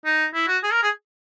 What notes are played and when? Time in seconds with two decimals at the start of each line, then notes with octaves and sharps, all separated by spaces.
0.05 D#4
0.34 E4
0.48 F#4
0.63 G#4
0.73 A#4
0.83 G#4